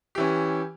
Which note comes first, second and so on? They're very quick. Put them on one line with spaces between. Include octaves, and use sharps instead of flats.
G4 E3 C#4